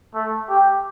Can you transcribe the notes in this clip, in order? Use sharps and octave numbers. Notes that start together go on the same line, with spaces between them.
A3
G4